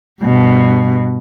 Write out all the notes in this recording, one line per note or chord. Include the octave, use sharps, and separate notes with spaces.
G2 B2